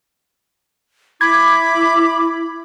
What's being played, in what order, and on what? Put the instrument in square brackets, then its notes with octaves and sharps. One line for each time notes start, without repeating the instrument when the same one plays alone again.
[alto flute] E4 [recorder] B5 [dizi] D6 [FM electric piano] G#6